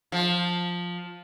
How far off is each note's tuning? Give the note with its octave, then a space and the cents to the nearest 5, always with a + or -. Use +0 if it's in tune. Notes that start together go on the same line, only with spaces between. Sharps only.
F3 +10